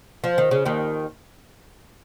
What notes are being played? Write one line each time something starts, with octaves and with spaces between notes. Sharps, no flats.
F3
D#3
C#3
D#2 D#3